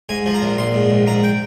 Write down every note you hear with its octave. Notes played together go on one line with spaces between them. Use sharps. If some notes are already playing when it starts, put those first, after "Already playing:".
G#2 G#5
F3
A#5
A#1
A#1 C6
G#2
A#1
G#2 A#5
G5